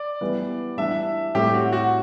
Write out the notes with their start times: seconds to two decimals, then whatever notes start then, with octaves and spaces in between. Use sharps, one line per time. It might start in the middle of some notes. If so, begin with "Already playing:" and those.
Already playing: D5
0.21 E3 G3 B3
0.78 E3 G3 D4 E5
1.35 A2 G3 C4 E4 G4
1.54 F#4
1.73 F#4